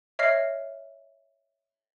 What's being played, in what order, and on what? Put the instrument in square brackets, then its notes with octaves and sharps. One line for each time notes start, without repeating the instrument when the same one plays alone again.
[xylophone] C#5 D#5 E5 F6 C7